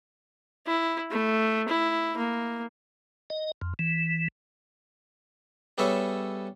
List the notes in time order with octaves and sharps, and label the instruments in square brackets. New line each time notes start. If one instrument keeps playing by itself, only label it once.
[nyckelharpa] E4
A3
E4
A#3
[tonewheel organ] D#5
F2
E3
[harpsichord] G3 B3 G#4 A4 C#5 E5